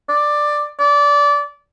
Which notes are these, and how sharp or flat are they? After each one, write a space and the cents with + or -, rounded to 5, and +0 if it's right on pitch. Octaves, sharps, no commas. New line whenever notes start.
D5 +10
D5 -20